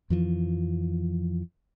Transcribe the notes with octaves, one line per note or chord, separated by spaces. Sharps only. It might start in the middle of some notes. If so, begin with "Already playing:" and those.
F2 E3 F3